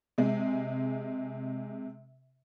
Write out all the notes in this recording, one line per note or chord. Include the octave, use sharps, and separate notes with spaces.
C3 G#3